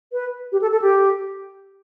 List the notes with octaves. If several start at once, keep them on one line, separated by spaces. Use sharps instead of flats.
B4
G4
A4
A4
G4